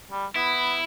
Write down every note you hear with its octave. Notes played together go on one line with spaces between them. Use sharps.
G3
B3 E4